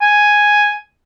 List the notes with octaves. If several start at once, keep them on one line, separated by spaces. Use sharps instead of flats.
G#5